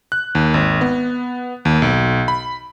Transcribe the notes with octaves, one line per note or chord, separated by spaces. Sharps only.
F#6
D#2
G#1
B3
D#2
B1
B5